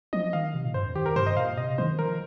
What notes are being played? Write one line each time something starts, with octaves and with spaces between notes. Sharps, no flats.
F3 D#5
D#3 F5
C3
A#2
G2 C5
F2
D#3 G4
A#4
G2 C5
D#5
A#2 F5
C3 D#5
D#3 C5
F3 A#4